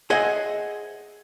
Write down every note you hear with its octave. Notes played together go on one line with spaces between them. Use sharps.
G#4 C5 D#5 E5 F#5 G#5